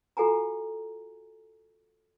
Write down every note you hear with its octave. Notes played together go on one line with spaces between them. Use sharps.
F4 F#4 A4 F#5 G#5 A#5